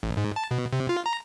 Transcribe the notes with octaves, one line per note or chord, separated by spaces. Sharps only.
A1
G#2
A5
B2
C3
F4
A#5